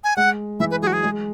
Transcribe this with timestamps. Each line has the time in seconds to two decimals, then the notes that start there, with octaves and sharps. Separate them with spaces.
0.04 G#5
0.16 G#3 F#5
0.60 E3 E5
0.71 B4
0.82 F#3 F#4 G#4
0.93 G#4
1.04 G#3